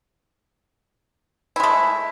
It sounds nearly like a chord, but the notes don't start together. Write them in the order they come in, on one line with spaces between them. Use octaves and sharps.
E4 G#3 A3